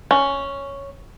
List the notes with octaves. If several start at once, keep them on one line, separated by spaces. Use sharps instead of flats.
C#4